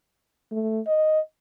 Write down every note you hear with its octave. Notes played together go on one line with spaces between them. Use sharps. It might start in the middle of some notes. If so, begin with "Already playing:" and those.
A3
D#5